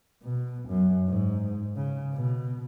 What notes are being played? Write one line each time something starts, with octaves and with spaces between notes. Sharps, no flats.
B2
F#2
G#2
C#3
B2